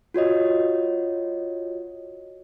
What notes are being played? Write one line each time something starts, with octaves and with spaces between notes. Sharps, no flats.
F4 F#4 C#5 D#5